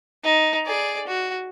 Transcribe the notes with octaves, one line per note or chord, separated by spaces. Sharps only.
D#4
G#4 D5
F#4